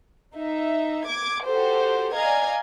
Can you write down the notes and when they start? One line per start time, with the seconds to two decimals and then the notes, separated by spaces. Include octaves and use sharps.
0.35 D#4 E5
1.07 D6 G#6
1.46 F#4 G4 A4 C5
2.14 D5 D#5 F5 G#5 A#5 G#6